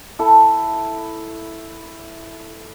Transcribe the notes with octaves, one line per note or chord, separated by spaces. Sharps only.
E4 A4